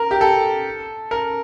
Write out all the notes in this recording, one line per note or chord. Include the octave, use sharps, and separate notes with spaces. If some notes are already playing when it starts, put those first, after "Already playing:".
Already playing: A#4
G4
A4
A#4